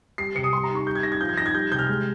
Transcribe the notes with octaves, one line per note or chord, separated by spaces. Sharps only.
G3 C7
C3 C#7
D#6
G3 C6
A#5
D#4
C#6
G3 G6
G#6
D#4 A#6
G#6
F3 G6
G#6
D#4 A#6
G#6
G3 G6
C3 G6
F6
G#3 G6